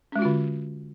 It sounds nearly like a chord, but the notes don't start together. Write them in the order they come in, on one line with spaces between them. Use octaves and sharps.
C#4 G#3 F#4 F4 D3